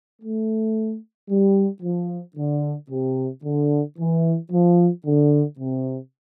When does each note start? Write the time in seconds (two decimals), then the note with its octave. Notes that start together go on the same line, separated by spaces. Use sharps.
0.22 A3
1.29 G3
1.83 F3
2.37 D3
2.91 C3
3.44 D3
3.99 E3
4.51 F3
5.05 D3
5.59 C3